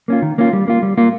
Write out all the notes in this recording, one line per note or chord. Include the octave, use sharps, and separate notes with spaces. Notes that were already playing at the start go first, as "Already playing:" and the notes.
A#3 C#4 F4
D#3
A#3 C#4 F4
G3
A#3 F4
G3
A#3 F4